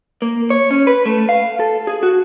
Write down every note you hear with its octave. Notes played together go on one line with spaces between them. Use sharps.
A#3
C#5
C#4
B4
A3
F5
A4
G#4
F#4